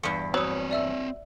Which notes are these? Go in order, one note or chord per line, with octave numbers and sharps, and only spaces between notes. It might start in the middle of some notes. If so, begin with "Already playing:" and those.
E2 G2 C#7
F#3 C4 C5 C#5 D#6
D5 E5 E6